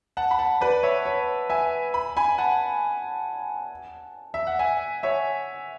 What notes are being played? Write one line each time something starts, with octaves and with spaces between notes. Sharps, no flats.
F#5 A5
B5
F#5 A5
B4 D5
C#5 E5
C#5
E5 G#5
B5
G#5 B5
F#5 A5
E5
F#5
E5 G#5
C#5 E5